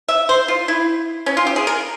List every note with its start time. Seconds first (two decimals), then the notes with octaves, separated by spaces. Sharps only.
0.08 E5
0.29 C5
0.48 F4
0.68 E4
1.26 C#4
1.37 F4
1.47 G4
1.56 G#4
1.67 A#4